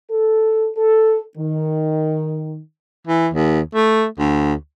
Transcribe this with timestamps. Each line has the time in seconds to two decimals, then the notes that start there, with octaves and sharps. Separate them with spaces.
0.10 A4
0.76 A4
1.37 D#3
3.07 E3
3.34 D#2
3.75 A3
4.19 D2